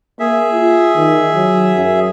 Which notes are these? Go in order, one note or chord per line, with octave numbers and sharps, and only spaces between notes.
A#3 G#4 E5
F4
D#3
F#3
F#2